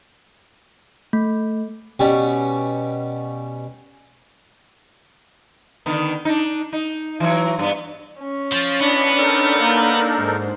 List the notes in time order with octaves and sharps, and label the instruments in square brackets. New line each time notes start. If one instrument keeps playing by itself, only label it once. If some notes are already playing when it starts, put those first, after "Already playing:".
[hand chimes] A3
[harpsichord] B2 G3 C#4
[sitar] D3 D#3 B3
D4 D#4
D#4
E3 F#3 C#5
G2 B3
[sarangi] C#4
[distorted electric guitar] F3 [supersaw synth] A6
[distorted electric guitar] B3 [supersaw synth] D4 [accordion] E4 D#5
[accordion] D#4 A4 A#4
[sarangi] A#3
[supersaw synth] G#2 [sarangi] C5